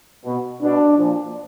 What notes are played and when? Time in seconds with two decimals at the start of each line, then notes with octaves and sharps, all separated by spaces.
0.25 B2
0.62 B2 D4
0.98 A#2 F3